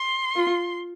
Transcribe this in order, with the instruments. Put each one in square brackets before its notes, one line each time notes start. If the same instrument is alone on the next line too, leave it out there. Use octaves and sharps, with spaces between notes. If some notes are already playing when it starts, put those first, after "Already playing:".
Already playing: [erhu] C6
[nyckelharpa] F4